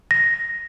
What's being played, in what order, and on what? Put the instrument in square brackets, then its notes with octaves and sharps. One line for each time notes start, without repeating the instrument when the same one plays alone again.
[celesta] A#6